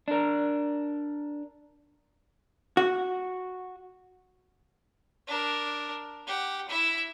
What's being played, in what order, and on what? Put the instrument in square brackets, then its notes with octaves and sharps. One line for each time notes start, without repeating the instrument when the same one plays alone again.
[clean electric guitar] D4 A#4
[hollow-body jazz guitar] F#4
[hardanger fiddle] D4 A#4
G4 F#5
E4 E5